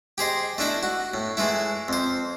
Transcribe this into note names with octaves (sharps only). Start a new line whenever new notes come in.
G4 G#4 C5 D#5
A3 D4 E4 D#5
F#4
A2
E3 G#3 A3 E4
F2 C5